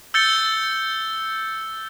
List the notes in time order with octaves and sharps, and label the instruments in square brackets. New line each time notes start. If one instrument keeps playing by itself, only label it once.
[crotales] E6 G6 A6 C#7 G7